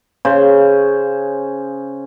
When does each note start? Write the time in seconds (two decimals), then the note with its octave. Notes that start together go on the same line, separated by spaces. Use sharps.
0.25 C#3 C5